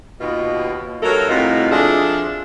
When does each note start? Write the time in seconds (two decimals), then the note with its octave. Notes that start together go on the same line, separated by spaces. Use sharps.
0.20 D#2 B2 F4
1.02 G2 F#3 A4 A#4
1.29 A2 C3 D#3 D#4 F4 F#4
1.71 F3 G#3 D4 G#4 A4 E5